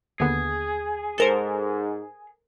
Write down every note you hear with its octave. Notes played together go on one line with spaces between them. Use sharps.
D#2 D3 B3 G#4
G#2 A4 A#4 C5